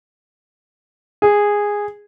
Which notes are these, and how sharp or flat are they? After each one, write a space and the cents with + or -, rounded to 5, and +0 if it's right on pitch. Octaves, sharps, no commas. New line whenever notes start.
G#4 -10